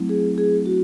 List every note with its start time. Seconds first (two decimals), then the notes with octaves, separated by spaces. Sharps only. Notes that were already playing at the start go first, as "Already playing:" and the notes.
Already playing: F#3 A3 C4 E4
0.09 G#4
0.38 G#4
0.66 F#4